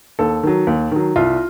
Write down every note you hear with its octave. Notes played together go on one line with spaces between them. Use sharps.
D#2 A4
D#3 F#3
D#2
D#3 F#3
C2 F4